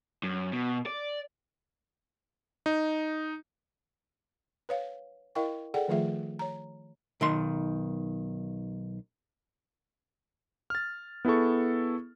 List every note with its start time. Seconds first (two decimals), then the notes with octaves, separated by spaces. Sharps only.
0.23 F#2
0.53 B2
0.86 D5
2.66 D#4
4.69 B4 C#5 F5
5.35 E4 A#4 D#5 F5 G5 C#6
5.74 G#4 A4 D5 F#5 G5
5.88 D#3 F3 A3 F4 G#4 E5
6.39 C#5 A#5
7.21 B1 D#3 C6
10.70 F6 A6
11.25 B3 E4 G#4 A4 C#6